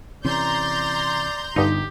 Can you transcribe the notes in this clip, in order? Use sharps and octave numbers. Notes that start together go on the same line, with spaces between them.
C3 E3 C#4 D5 A#5 C6 G6
G1 G2 D3 D#4 G4